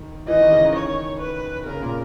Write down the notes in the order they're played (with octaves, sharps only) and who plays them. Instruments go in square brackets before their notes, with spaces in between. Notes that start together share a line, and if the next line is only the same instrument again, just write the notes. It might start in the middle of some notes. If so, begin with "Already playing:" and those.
Already playing: [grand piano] D#3
[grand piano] E3 [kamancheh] D#5
[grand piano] D#3
C#3
D#3
[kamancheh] C#5
B4
[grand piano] C#3 [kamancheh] A#4
[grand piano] A#2